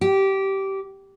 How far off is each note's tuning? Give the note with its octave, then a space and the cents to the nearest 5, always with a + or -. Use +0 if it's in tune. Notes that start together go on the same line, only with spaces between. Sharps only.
G4 -15